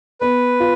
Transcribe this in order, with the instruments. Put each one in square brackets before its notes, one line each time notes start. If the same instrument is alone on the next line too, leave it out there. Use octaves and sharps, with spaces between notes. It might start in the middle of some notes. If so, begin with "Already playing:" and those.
[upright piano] B3 [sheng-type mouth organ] B4
[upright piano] F4